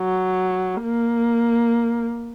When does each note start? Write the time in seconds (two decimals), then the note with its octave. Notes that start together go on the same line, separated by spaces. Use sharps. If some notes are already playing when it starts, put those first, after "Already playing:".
Already playing: F#3
0.82 A#3